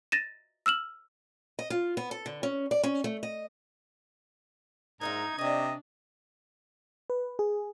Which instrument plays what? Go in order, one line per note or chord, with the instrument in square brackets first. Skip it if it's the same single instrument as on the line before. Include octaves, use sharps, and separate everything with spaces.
[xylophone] A6 A#6 D#7 E7
E6 F6 E7 F#7
[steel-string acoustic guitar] D#5
F4
B3
A4
D3
C#4
D5
C#4
A3
D#5
[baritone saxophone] G#2 [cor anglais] D#4 [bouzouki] A#4 D#5 E5 [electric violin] A#5 G#6
[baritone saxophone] C3 [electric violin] D4 [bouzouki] D#4 D5 [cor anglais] D#5
[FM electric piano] B4
G#4